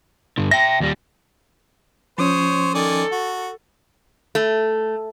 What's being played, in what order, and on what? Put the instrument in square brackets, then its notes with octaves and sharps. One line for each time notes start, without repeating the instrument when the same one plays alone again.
[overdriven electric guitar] G2 D3
[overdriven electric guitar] E5 G5 [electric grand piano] A#6
[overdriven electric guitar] D#2 G3
[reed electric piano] F3 C#4 [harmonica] C5 [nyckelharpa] C#5 D#6
[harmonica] D#3 D5 G#5 [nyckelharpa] A4
[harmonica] F#4
[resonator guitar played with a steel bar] A3